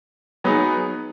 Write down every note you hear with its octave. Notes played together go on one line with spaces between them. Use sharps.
F#3 B3 D#4 G#4